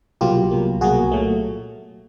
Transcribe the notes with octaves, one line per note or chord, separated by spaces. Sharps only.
C2 B2 F#3 A#3 F4 G4
C2 B2 F#3 A#3
C2 B2 F#3 A#3 F#4 G#4
A#2 F#3 A3